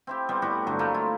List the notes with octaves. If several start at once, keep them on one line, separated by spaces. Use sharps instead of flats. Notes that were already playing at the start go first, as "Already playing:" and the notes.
C4 E4 G4
G3 B3 C4
A2 G3 F#4 G4
G2 D3 F#3
A3 A#3
E4 F4